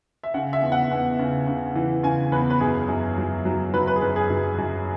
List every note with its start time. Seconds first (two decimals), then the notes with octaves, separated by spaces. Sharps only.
0.23 E5
0.34 C#3 F#5
0.53 E5
0.62 E2
0.72 F#5
0.91 E2
1.19 C#3
1.47 C#3
1.75 E3
2.03 C#3 G#5
2.32 E2 B4
2.50 B4
2.60 F#2 G#4
2.88 F#2
3.18 F#3
3.45 F#3
3.74 F#3 B4
3.88 B4
3.96 G#4
4.01 F#2 B4
4.16 G#4
4.30 F#2
4.58 F#2